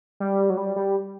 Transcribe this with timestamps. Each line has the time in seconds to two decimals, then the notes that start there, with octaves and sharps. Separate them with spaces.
0.20 G3
0.50 F#3
0.57 G3
0.76 G3